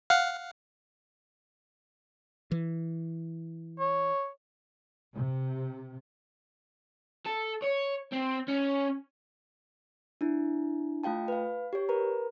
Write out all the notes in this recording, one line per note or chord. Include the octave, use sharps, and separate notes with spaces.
F5 F#5
E3
C#5
C3
A4
C#5
C4
C#4
D4 E4
A3 F4 F5 G5 A5
B4 F5
G4 C#5
A#4 B4 A#5